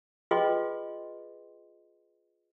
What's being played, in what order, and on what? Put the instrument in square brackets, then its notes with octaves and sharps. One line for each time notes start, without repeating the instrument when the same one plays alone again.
[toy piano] F4 G#4 B4 D#5 G5 C6